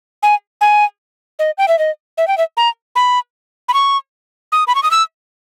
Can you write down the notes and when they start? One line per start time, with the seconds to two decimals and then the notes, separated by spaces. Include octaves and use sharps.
0.23 G#5
0.61 G#5
1.39 D#5
1.58 G5
1.68 E5
1.79 D#5
2.18 E5
2.28 G5
2.38 E5
2.57 A#5
2.96 B5
3.69 B5
3.74 C#6
4.52 D#6
4.67 B5
4.75 C#6
4.83 D#6
4.91 E6